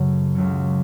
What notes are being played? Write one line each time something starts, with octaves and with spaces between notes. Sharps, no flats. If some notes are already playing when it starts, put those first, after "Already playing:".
Already playing: F#2 C#3 F#3 A3
C#2 C#3 F#3 C#4